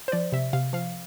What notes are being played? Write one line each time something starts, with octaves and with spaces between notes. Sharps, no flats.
C5
F3 D5
C3 E5
C3 F5
F3 F5